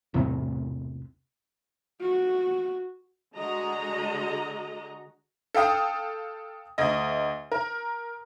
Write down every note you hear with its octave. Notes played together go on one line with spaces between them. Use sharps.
E1 C2 A2 C4
F#4
D3 G#3 F#4 D#5 A#5
A4 F5 G5 D#6
D2 D#5
A#4